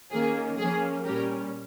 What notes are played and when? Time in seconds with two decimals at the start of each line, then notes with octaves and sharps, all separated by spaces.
0.11 D#3 A#3 C#4 G#4
0.58 F3 A#3 C#4 G#4
1.04 A#2 G3 C#4 G4 A#4